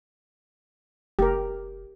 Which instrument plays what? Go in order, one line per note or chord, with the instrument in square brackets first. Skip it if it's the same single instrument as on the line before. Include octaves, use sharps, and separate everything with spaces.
[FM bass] F1 [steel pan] G4 A#4